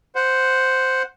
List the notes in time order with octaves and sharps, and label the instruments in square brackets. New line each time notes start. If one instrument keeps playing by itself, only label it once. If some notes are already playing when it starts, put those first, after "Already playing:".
[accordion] C5 F#5